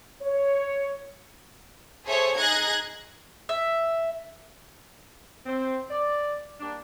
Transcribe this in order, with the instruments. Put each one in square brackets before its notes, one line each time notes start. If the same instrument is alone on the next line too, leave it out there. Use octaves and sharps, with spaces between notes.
[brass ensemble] C#5
[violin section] G#4 A4 C5 C#5 E5
D#4 G#4 F#6 G#6 A#6
[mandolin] E5
[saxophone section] C4
D5
G3 A#3 D4